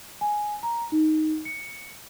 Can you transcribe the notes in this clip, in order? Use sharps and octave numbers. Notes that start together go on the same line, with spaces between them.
G#5
A#5
D#4
C#7